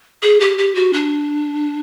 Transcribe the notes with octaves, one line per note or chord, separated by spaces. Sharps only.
G#4
G4
G4
F#4
D4